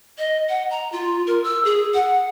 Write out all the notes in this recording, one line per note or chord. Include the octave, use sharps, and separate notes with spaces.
D#5
F#5
A#5
F4
A#4
E6
G#4
F#5